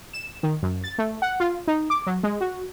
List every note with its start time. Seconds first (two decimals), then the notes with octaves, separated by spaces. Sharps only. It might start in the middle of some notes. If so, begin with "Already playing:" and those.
0.13 E7
0.43 D#3
0.62 F#2
0.84 A6
0.98 A3
1.22 F#5
1.40 F4
1.68 D#4
1.90 D6
2.06 F#3
2.23 G#3
2.41 F#4